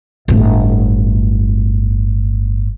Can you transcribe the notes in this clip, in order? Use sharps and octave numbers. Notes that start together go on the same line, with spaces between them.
G1 A2